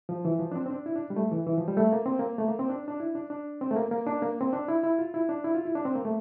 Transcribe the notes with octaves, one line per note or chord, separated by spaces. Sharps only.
F3
E3
F3
D4
C4
C4
D4
E4
D4
G3
A3
E3
E3
F3
G3
A3
A#3
C4
A#3
A3
A#3
C4
D4
D4
E4
D4
D4
C4
A3
A#3
A#3
D4
A#3
C4
D4
E4
E4
F4
E4
D4
E4
F4
E4
D4
C4
A#3
A3